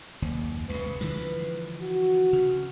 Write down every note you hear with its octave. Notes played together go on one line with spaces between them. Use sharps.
F#1 D#2
C#2 C3 B4
D3 E3 F3
F#4
C#3